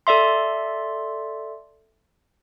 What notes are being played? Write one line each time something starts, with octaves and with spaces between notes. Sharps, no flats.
A4 D5 E5 C6